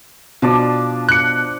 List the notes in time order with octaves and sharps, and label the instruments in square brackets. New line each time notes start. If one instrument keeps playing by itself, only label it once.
[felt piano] B2 [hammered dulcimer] F3 D4 D5
[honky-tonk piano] F#6 C#7